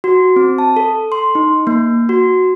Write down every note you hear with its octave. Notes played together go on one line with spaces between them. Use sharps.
F#4
C4
A5
A4
C6
D#4
A#3
F#4